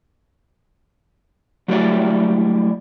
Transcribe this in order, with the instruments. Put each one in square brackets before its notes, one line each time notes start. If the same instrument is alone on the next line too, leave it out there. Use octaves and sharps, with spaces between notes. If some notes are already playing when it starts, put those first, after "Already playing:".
[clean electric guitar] F#3 G3 A3 E4 F#4 D5